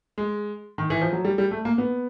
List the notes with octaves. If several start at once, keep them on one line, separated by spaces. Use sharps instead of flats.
G#3
D#3
E3
F3
F#3
G3
G3
A3
A#3
B3